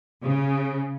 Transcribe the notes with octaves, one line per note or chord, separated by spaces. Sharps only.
C#3